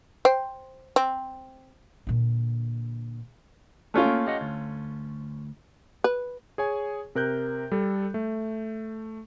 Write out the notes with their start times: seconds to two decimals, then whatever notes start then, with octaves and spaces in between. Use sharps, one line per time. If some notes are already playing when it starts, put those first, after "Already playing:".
0.25 C5 G5
0.96 C4
2.07 A#2 D3
3.94 A3 C#4 F4
4.06 A#3
4.27 G4 D#5 F#5
4.41 D2
6.04 B4
6.58 G#4 C#5 G#5
7.15 C3 A#4 F#6 G6
7.72 G3 A4
8.14 A3